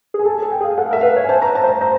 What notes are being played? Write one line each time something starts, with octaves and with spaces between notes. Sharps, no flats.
G#4
G#5
A4 A5
A4 G#5
G5
G#4
F5
A4 F#5
F5
A#4 E5
B4 F5
C#5
G#5
C5 A5
A#5
B4
A5
C5
A5
C5 A#5